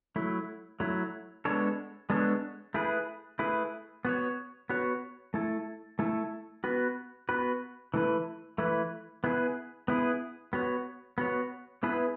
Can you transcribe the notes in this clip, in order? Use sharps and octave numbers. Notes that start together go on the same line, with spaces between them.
F#3 A3 E4
F#3 A3 E4
G#3 B3 D4 A4 C#5
G#3 B3 D4 A4 C#5
A3 E4 G#4 B4
A3 E4 G#4 B4
B3 F#4 C#5
B3 F#4 C#5
A3 E4 A4
A3 E4 A4
B3 F#4 B4
B3 F#4 B4
E3 A3 E4 B4
E3 A3 E4 B4
B3 E4 G#4 B4
B3 E4 G#4 B4
B3 F#4 C#5
B3 F#4 C#5
B3 E4 G#4 B4